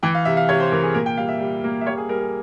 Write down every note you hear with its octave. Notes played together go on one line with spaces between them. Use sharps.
E3 G5
F5
C3 E5
F5
C3 C#5
C5
E3 A#4
G#4
A#2 A#4
G5
G3 F5
E5
G3
A#3
E5
G3 C#5
G#4
G3 A#4
G#4